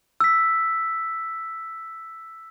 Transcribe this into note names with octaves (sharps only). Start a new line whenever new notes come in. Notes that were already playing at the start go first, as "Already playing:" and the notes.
E6 B6